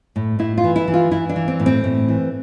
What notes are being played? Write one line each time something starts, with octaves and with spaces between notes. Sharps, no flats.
A2
A2 E4
F4
E3
E4
E3
F4
E3 E4
D4
E3
C4
A2
C4
A2
E3